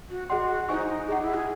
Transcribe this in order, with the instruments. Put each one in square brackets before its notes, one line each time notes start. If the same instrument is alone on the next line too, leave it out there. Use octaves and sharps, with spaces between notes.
[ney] F#4
[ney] F#4 [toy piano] G#4 D#5 F#5 C6
[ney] D#4 [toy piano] E4 C5 D#5 G#5 C#6
[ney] D#4
[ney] D#4 [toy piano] G#4 D#5 F#5
[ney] E4
G#4